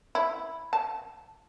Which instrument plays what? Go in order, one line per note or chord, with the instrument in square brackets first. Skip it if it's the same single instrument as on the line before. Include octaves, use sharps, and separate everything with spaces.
[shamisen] E4
A5